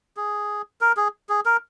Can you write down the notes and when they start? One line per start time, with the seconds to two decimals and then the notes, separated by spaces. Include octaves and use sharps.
0.17 G#4
0.81 A#4
0.97 G#4
1.29 G#4
1.46 A#4